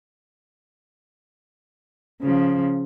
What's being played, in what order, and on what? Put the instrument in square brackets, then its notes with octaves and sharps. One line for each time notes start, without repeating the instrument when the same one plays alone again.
[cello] C#3 F3